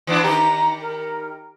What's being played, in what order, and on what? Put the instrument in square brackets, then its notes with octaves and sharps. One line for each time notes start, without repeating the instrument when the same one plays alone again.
[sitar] E3 B3 D4
[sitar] D#3 G4 [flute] A#5
[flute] A#4